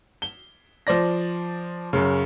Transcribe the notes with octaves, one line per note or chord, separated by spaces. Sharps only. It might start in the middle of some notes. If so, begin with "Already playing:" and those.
G7
F3 C5 D5 A#6
F#2 C#3